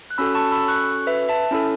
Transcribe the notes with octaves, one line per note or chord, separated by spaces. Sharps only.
F#6
C#4 F#4 A4 B5 E6
A5 C#6
B5 E6
C#6 F#6
B4 E5
E5 A5
C#4 E4 A4